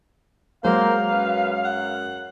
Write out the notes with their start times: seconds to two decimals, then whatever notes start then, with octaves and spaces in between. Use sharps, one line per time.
0.64 F#3 G#3 A#3 C5 F5
1.11 F#2 B4
1.65 F#5